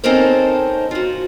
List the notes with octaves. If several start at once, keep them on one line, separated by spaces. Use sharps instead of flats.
C4 C#4 D#4 A4 A#4 C5
F4 F#4